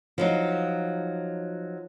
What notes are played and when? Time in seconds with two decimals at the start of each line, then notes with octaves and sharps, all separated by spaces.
0.18 F3 F#3 D#4